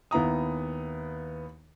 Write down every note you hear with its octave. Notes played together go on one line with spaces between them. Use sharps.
D#2 B3 E4 A#5 D#6